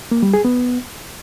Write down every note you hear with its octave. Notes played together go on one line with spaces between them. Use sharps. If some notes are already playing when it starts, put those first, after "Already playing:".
A#3
G3
G#4
B3